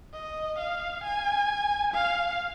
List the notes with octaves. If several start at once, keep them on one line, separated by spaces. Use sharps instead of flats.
D#5
F5
G#5
F5